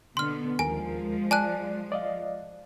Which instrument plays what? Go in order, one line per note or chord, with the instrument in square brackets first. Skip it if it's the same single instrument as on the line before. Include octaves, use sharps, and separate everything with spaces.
[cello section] B2 D3 B3 [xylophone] C6 F6
[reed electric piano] D#2 A#4 [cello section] F3 G#3 [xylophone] G#5
[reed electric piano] D5 [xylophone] G#5 A5 F#6
[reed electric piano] D5 D#5 F5